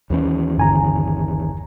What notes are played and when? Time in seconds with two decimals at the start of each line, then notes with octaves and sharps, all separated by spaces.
0.10 D#2 E3 C#4
0.58 G1 G#5 A#5